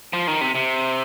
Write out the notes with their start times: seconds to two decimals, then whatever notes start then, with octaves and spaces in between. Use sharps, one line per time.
0.13 F3
0.27 D#3
0.41 C3
0.55 C3